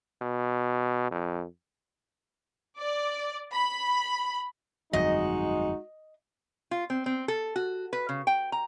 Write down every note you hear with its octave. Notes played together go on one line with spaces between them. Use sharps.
B2
F2
D5
B5
G1 F2 F#3 G#3 D#4 F#4 D#5
F4
C4
C4
A4
F#4
B4
C#3
G5
A#5